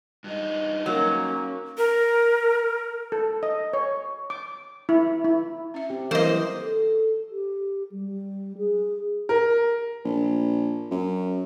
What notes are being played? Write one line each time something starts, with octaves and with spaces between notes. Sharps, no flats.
G2 D#4
F#3 A#3 C#4
A#4
A4
D#5
C#5
D6
E4
E4
C#4 E5
C4 G4
E3 F#3 G3 A#3 B4 C5 D#5
A4
G4
G3
G#4
A#4
A#1
F#2